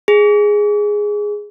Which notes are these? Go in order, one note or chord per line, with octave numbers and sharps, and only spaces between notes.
G#4